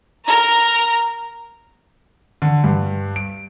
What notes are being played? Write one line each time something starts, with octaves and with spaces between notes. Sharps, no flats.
A#4 A#5
D3
G2
D7